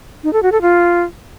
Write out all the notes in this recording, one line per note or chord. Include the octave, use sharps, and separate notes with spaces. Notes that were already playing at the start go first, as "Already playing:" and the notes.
D#4
A4
F#4
A4
F4